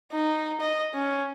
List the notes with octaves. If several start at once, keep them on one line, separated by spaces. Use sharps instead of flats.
D#4
D#5
C#4